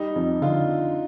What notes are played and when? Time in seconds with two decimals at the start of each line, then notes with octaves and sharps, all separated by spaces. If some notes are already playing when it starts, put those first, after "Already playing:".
Already playing: G3 D#4
0.15 F2
0.42 D3 F4